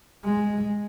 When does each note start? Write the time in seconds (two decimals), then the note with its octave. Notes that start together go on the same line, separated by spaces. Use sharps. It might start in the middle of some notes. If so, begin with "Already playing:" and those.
0.24 G#3